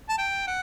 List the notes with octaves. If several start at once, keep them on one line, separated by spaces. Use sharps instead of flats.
A5
G5
F#5